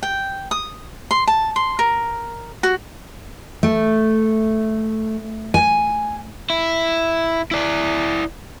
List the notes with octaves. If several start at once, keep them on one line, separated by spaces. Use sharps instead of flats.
G5
D#6
C6
A5
C6
A#4
F#4
A3
G#5
E4
E4 D5